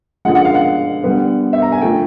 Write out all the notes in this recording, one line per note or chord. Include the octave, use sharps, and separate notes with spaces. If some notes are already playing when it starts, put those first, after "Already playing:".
D3 F3 G#3 F#5
F#5
F5
F#5
D3 G3 B3
E5
A#5
G#5
D3 F3 A3 G5